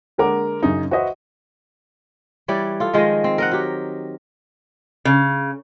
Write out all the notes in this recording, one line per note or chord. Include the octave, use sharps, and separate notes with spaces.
D3 G#3 A#3 A#4 F#5 D6
F#2 C#3 D#4
F#4 B4 C5 D#5 E5
E3 G3 C#5 D5
F4 A4
D#3 F3 G#3 D#5
C4
A#4 D#5 F#5
F#3 G4
C#3